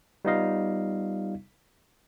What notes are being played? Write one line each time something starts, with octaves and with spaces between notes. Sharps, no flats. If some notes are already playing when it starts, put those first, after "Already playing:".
G3 B3 D#4 F4 D#5 F5